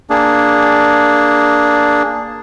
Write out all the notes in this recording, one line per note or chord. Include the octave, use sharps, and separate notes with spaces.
A#3 D4 G#4